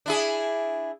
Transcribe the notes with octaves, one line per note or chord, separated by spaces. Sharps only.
D4 E4 G#4